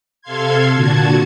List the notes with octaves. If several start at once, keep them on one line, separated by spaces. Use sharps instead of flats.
C3 A4 F5 C6 G#6
A#2 D3 F#4 A5 G#6